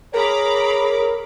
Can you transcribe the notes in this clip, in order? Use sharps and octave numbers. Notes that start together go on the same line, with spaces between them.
G#4 A#4 C#5 A#5 B5 D6